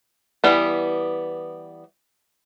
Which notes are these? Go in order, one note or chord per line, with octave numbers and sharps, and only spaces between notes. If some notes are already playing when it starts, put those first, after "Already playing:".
E3 G3 B3